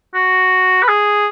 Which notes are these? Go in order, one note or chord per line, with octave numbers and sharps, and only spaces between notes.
F#4
B4
G#4